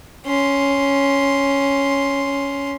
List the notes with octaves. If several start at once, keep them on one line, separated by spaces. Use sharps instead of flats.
C#4 C6